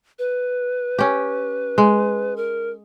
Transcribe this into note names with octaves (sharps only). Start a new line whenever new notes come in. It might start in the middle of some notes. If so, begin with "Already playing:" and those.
B4
C#4 G4
G#3
A#4